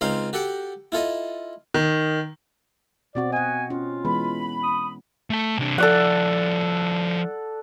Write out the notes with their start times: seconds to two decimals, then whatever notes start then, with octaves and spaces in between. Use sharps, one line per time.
0.01 C#2 C4 C#4 D#4 C5 F5
0.33 F#4 G4 A4 F#5 G5
0.92 E4 F4 A4 D#5
1.74 D#3
3.15 B2 C4 F#4 D5
3.32 D#5 F#5 G#5
3.70 C#4 F4
4.05 E3 G#3 B3 B5
4.63 D#6
5.30 A3 A5
5.59 C3 D4
5.78 F3 E4 A4 D5 F#5